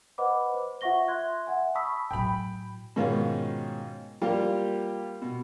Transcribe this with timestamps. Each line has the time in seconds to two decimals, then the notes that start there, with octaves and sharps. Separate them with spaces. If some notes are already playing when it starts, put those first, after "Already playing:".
0.18 B4 C5 D#5 F#5 B5 D6
0.54 C5
0.81 F4 E5 F#5 C#6 A#6 G7
1.08 E5 C6 F#6 G#6
1.47 E5 F#5 G#5
1.75 A5 B5 C#6 D#6 E6 B6
2.11 A2 F#3 G5 B5
2.96 G#2 B2 D#3 C#4 F4
4.21 F3 G3 A#3 F4 G4
5.22 B2